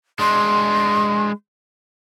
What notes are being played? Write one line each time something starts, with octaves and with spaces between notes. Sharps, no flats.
G#3 D4 C6